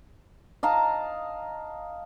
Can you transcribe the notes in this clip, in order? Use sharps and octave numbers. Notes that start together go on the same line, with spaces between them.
D#5 F5 A5 A#5